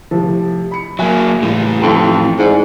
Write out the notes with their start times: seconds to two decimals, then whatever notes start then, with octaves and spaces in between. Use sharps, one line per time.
0.11 A2 C3 F3
0.71 B5 C#7
0.99 F#3 A#3 E5 G#5 F#6
1.42 A2 C#3 E3 G3
1.82 B1 F2
2.38 G#2 E4 D5